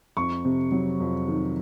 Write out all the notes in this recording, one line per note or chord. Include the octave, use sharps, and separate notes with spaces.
F2 C#6
C3
F#3
F2
D#3